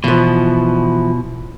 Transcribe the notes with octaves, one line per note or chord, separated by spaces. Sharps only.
B2 E3 F3